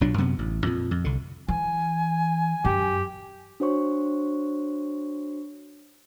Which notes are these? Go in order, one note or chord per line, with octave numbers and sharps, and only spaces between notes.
B1 A#2 F#3 D4
F#2 C3 B3
A1
F2 A#2
F2
C2 D3
E3 G#5
F#2 G4
D4 F#4 C5 C#5 C#6